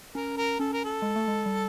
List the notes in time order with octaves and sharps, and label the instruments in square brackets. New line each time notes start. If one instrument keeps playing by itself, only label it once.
[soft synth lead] C#4 [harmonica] A#4
[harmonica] A#4
[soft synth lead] C#4 [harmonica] A4
[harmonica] A#4
A4
[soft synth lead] G#3
A3
G#3
G3